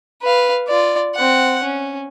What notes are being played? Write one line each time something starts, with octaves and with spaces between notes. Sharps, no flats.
B4 F5
F4 D5
C4 F#5
C#4